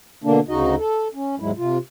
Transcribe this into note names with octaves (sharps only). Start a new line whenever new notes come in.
B2 D3 A#3 D4
D2 C#3 D#4 F#4 D#5
A4
C#4
D#2 G#2 F#3 G#3 E4
C3 F4